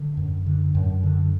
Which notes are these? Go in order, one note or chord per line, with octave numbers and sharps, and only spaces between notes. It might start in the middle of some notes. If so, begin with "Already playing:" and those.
Already playing: D3
F#2
D3
F#2
D3